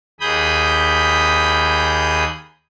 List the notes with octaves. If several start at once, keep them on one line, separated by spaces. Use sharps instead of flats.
D#2 G#4 B5 D#6 G6